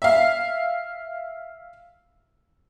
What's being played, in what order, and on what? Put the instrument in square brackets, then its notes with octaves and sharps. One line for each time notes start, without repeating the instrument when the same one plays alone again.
[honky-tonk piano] E5 F5